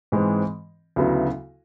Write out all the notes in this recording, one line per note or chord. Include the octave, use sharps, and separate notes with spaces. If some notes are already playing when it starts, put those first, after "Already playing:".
G#2 E3 G#3 C4
D2 C#3 F#3 B3 E4